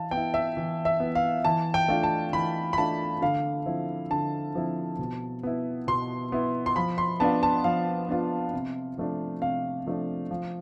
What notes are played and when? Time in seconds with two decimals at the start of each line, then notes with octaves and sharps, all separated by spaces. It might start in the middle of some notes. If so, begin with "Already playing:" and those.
Already playing: E3 F5 A5
0.11 B3 G5
0.17 E4
0.34 E5
0.57 E3
0.85 E5
1.00 B3 E4
1.15 F5
1.44 E3 A5
1.74 G5
1.88 A3 D4 F4
2.03 A5
2.33 E3 B5
2.73 B5
2.78 A3 D4 F4 A5
3.22 D3 F5
3.66 F3 C4 E4
4.11 D3 A5
4.55 F3 C4 E4
4.99 B2
5.43 B3 E4
5.87 B2 C6
6.32 B3 E4
6.66 C6
6.76 F3 B5
6.98 C6
7.20 B3 D4 F4 A5
7.43 A5
7.64 F3 F5
8.09 B3 D4 F4
8.53 C3
8.98 F3 A3 D4
9.41 C3 F5
9.86 F3 A3 D4
10.31 F3